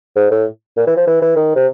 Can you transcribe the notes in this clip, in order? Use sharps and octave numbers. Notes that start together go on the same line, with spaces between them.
G#2
A2
A#2
E3
F3
E3
E3
D#3
C3